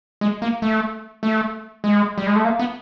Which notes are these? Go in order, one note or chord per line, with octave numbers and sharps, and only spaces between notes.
G#3
A#3
A3
A3
G#3
G3
G#3
A3
A#3
B3